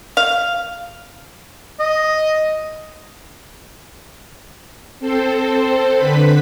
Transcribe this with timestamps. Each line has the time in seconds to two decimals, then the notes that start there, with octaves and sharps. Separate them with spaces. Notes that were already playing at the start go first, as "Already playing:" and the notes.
0.17 F5
1.80 D#5
5.00 C4 A4 C5
5.95 D3 B4 B5